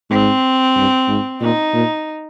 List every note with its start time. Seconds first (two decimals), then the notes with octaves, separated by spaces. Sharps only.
0.10 G#2 C4
0.76 G2
1.08 G#2
1.41 A#2 D#4
1.73 A#2